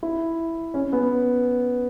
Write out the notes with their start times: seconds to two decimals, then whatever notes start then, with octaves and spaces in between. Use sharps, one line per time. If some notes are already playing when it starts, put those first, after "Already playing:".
0.03 E4
0.74 C#4
0.93 B3